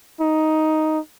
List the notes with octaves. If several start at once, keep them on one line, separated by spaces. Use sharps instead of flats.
D#4